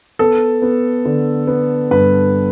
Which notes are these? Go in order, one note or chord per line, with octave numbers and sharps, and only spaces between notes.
B3 A4
B3
D3
B3
G2 B4